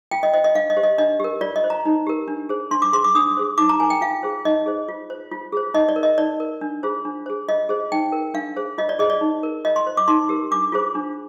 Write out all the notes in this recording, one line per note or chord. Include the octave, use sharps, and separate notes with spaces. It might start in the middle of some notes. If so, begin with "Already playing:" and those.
F4 G5
D#5
C5 D#5
D#5
D4 F5
D#5
G4 C5
D#5
D4 D#5
G4 A#4
F4 D5
D#5
C5
A#5
D#4
G4 A#4
D4
G#4 C5
D4 C6
D6
G#4 C5 C6
D6
D4 D#6
G#4 C5
D#4 D6
A#5
A#4 G#5
G5
F4 F5
G#4 C5
D#4 D#5
G#4 C5
F4
C5
F4
G#4 C5
D#4 D#5
D5
A#4
D#5
D#4 D5
A#4
D4
F4 G#4 C5
D4
G#4 C5
F4 D#5
G#4 C5
D#4 G5
A#4
D4 F5
G#4 C5
F4 D#5
D5
G#4 C5 D#5
D5
D#4
A#4
F4 D#5
C6
C5
D6
D#4 C6
G4 A#4
D4 D6
F4 G#4 C5
D4